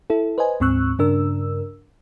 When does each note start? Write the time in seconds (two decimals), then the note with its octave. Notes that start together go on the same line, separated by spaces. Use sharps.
0.10 E4 A4
0.38 B4 C5 D#5 G#5
0.60 D2 G#2 C4 C#6 E6 F#6
0.99 G2 C#3 D4 A#4 E6